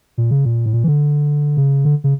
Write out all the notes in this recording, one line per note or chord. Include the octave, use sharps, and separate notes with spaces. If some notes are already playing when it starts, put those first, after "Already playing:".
A#2
C#3
A#2
A2
A#2
E3
D3
C#3
D3
C#3